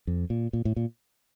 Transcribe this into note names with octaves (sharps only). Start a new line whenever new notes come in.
F2
A#2
A#2
A2
A#2